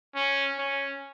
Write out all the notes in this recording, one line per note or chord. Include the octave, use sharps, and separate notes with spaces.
C#4
C#4